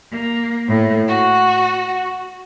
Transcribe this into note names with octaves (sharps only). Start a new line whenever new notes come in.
A#3
A2
F#4